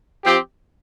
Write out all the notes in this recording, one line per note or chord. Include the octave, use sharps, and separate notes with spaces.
F3 C4 G4